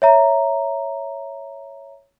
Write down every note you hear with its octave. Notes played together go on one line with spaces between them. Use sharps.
C#5 E5 A#5